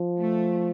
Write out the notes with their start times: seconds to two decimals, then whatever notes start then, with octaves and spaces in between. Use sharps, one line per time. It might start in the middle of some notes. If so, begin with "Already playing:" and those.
Already playing: F3
0.19 A3